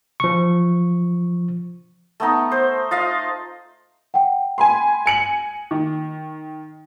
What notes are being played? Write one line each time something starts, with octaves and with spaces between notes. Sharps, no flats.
F3 C#6
A3 B3 D#4
C5
F4 D#5 F5
F#5 G5
G#5 B5 C6
G#5 C#7 F#7
D#3